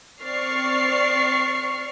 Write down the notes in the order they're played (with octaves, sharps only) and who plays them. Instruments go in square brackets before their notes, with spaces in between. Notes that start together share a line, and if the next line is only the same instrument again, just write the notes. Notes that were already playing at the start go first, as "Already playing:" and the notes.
[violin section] C4 D5 C#6 F6 C7